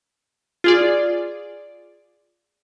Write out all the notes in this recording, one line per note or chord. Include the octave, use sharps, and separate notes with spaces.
F4 G#4 D5